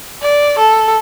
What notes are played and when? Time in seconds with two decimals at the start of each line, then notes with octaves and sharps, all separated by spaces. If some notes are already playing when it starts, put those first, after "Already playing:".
0.22 D5
0.58 A4